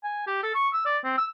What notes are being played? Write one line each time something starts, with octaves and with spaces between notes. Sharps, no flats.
G#5
G4
A4
C#6
E6
D5
C4
E6